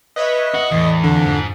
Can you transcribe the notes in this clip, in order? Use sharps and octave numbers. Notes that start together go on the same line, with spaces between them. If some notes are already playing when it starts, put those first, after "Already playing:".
B4 C#5 D#5 E5
F#4
E2 A2
F2 D3
G#2